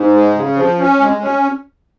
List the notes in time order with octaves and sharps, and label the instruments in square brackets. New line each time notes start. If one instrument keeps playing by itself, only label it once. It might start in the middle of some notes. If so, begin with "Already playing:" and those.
Already playing: [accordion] G#2
G#3
C#3
F3
C#4
G#3
C#4